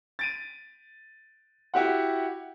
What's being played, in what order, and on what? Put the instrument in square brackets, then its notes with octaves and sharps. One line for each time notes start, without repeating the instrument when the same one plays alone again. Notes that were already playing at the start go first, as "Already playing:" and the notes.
[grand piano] A6 D7 D#7
E4 F#4 G4 F#5